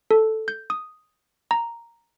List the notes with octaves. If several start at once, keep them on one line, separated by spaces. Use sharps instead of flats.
A4
G6
D#6
A#5